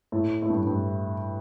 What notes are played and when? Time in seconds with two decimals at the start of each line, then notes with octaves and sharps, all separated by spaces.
0.12 A2
0.42 A2
0.50 G2
0.67 G2